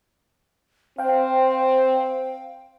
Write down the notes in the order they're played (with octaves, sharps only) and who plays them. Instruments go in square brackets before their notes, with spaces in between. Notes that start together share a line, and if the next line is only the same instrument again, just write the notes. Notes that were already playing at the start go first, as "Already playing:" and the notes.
[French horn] C4 [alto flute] C5 [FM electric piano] F5 G5